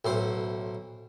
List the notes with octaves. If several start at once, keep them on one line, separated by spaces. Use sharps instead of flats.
B1 A2 C5